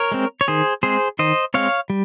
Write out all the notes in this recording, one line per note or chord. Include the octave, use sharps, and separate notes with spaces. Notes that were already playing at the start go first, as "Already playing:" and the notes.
Already playing: A#4 C#5
G#3 C4
C#5
D#3 G#4 C5
G#3 C4 G#4 C5
D#3 C5 D#5
G#3 C4 C#5 F5
G3